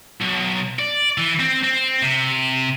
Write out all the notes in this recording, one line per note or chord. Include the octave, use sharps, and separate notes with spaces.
B1
D5
E3
C4
C4
C3